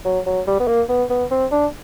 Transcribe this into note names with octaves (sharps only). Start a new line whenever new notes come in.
F#3
F#3
G3
B3
A#3
B3
B3
C4
D4